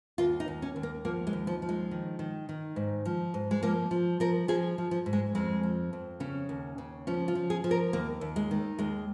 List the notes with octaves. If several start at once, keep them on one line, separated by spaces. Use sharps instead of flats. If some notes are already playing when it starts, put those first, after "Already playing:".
D#2 F4
D#4
D#2
C#4
D#2
A#3
F3 A#3
G#3
D#2
F3
F3
G#3
D#3
D#3
D#3
G#2
F3
G#2
G#3
F3 A#3
F3
F3 A#4
F3 G#4
F3
F3
G#2
G#3
F2 G#3
F3
F2
C#3 C#4
D#2
C#3
F3 C#4
F4
F3
G#4
F3
A#4
D#2 A#3
D#2
G#3
D#3
D#2 G#3